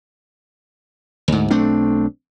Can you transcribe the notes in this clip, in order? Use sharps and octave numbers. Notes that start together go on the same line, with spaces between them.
D2 G#2
B1 A3 C4 D4